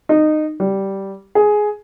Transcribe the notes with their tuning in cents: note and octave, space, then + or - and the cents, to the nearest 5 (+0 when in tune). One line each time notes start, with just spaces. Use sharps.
D#4 -20
G3 -10
G#4 +10